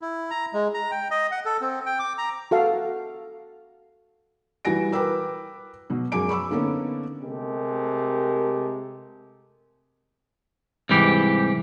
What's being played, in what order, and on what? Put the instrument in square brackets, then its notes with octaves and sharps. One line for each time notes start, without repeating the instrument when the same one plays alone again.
[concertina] E4
A#5
G#3
A#5
G5
D#5
F#5
A4
C4
G5
D6
A#5
[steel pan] F#4 A4 F5 A5
[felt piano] E3 G3 F#4 G#5 A#6 D7
A#4 B4 G5 D6 E6
B2 F#3
F#2 G#3 F#4 G#5 D6 D7
B5 C#6 D6 E6
D3 A#3 B3 C#4 D#4 A4
[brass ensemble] C3 G#3 A3 G4 A#4
[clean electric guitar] C2 G#2 E3 G4